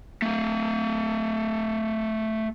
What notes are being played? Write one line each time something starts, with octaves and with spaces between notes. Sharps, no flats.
A3 F5